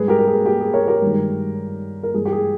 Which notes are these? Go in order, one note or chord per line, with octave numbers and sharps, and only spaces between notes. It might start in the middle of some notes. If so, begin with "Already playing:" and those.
Already playing: G#2 G3 G#4 B4
G4 A#4
A#4
G#4
G4
G#4
A#4 C#5
G4 A#4
G2 D#3 G#3
A#4
G2 E3 G#3 G#4
G4
G#4